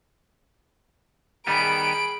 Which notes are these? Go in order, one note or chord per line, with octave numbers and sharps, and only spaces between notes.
D#3 G3 B3 G#4 B5 D7